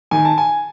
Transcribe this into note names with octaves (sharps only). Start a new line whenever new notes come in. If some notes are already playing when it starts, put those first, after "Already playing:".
D#3 G#5
A5
G#5